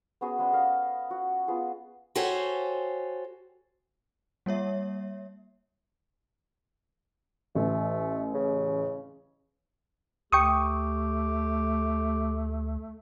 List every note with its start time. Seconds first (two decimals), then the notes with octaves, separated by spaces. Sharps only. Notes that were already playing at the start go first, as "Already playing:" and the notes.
0.21 B3 C#4 F#4 G#4
0.39 G#3 B3 C#4 D5
0.52 A4 D#5 F5
1.11 F#4
1.48 B3 F4 G#4
2.15 F#4 G4 A4 C5 C#5 G#5
4.46 G3 A#3 C#5 E5
7.55 A1 A3
8.34 C#3
10.32 D2 A3 G4 G5 C#6 D#6